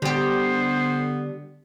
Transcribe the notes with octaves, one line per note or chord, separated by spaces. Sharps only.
D3 G3 B3 G4 C5